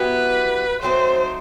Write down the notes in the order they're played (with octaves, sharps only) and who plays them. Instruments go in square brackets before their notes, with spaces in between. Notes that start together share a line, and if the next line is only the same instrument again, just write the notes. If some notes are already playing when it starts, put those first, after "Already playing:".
Already playing: [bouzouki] F#3 B3 E4 G4 [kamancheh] B4
[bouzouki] F#3 A3 C4 D#4 [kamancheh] C5